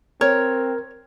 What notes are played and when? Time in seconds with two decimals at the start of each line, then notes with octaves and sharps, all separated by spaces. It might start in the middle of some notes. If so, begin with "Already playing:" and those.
0.21 C4 A#4 C#5